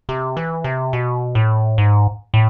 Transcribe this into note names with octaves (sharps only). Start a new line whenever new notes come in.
C3
E3
C3
B2
A2
G#2
A2